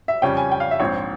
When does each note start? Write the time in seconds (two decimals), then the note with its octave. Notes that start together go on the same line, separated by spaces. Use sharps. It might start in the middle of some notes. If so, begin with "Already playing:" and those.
0.08 E5
0.22 F2 C#3 G3 C#4 G5
0.37 G#5
0.52 G5
0.60 F5
0.71 E5
0.80 A#1 G#2 F3 C4 C#5